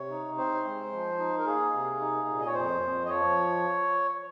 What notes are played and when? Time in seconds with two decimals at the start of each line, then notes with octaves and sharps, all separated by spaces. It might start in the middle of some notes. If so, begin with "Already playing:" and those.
Already playing: C3 C#5
0.10 D#4
0.37 C4 C5
0.64 G#3
0.92 F3
1.18 D#4
1.38 A#4
1.46 A#3 G#4
1.74 C3
2.00 D#4
2.28 A#2
2.40 D#5
2.47 C#5
2.54 F2 C5
2.82 F2
3.05 D#5
3.09 F3 C#5